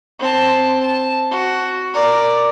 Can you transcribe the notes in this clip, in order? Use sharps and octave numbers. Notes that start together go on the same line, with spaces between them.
C4 A5
A5
F#4
A#4 D5